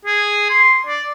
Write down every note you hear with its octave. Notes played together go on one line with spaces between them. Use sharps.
G#4
C6
D5